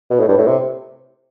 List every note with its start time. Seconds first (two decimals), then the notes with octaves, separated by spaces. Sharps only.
0.10 B2
0.20 A2
0.28 G2
0.38 A2
0.47 C3